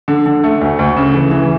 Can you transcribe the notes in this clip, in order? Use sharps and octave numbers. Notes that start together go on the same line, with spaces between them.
D3
D3
A3
D2
D2
C#3
E3
E3